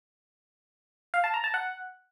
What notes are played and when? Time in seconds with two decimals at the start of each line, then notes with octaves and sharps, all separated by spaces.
1.14 F5
1.24 A5
1.34 A#5
1.44 A5
1.54 F#5